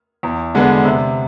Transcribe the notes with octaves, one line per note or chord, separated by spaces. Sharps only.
E2
D3 G#3 B3 D4
C3